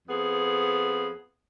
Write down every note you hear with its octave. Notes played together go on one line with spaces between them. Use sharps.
F2 B3 G#4